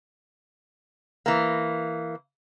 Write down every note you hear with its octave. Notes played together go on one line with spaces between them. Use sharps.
E3 A#3